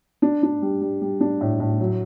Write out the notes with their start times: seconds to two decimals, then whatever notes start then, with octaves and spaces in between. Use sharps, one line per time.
0.22 D4
0.43 D4
0.62 G3
0.81 G3
1.01 G3
1.20 D4
1.41 A2
1.60 A2
1.80 F#3